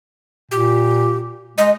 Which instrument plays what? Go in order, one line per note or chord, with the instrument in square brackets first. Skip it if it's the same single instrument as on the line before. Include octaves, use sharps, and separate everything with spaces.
[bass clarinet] A#2 [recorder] G4
[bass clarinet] G#3 [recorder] D#5